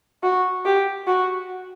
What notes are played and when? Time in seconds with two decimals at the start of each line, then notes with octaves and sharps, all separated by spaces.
0.23 F#4
0.65 G4
1.07 F#4